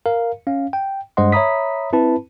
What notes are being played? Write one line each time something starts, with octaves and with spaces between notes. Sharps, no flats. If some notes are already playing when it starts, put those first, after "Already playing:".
A#4 F5
C#4 F5
G5
G2 G#3 C5 D#5 F#5 C6
C#5 E5 A#5 B5 D#6 B6
C4 E4 B4 A5 B5